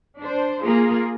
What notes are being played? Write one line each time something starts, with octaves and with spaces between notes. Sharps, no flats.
D4 C5
A#3 F4 G#4